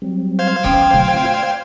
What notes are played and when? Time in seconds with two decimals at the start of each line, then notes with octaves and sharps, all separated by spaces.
0.02 F#3 G3 C4
0.39 C5 F5 G#6
0.64 E3 C#4 G5 D6 D#6
0.93 B2 D3 F#3 A3
1.14 C4 F4 E5
1.31 D5